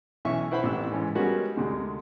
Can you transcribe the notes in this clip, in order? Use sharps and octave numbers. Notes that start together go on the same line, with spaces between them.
B1 E3 C#4 E5 C#6
E4 B4 C5 F#5 B5
A1 C3 E4 G4 E6
G#2 E3 C#4
G3 G#3 B3 C#4 F#4 A#4
D2 C3 G#3